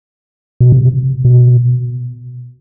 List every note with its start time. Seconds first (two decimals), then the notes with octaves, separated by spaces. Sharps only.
0.61 B2
0.72 C3
1.25 B2